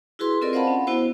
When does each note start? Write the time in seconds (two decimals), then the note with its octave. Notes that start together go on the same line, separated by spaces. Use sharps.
0.19 E4 F#4 G#4 B4 C6
0.42 C4 F4 A4 A#4 D5 D#5
0.53 C5 D#5 F5 F#5 A5 B5
0.67 C#4
0.87 B3 E4 F#4 C5